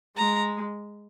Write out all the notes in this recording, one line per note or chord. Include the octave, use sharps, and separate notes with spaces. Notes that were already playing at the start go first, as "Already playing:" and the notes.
G#3 A#5